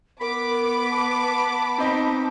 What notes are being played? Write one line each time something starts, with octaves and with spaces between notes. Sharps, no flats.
B3 A#4 B5 D6
A5
C4 D#4